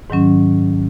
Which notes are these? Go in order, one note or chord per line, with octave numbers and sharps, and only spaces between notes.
G#2 D#3 F#3 C#4